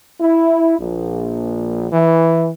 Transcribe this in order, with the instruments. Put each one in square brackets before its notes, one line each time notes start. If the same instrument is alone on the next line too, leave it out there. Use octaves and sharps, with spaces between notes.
[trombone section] E4
A#1
E3